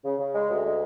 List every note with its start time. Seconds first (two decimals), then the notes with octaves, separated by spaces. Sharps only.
0.05 C#3
0.20 C#3
0.35 G#3
0.50 D2
0.65 G#3